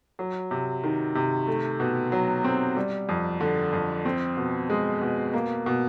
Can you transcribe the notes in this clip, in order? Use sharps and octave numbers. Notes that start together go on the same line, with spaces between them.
F#3
C3
D#3
C3
A3
B2
F#3
C4
G3
F2
D3
F2
C4
B2
G#3
B2
A#3
B2